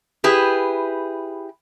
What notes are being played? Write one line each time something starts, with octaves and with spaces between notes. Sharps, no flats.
E4 G4 G#4 B4